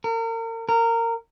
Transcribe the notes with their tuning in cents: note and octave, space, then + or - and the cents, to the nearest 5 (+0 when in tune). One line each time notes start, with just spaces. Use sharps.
A#4 -35
A#4 -20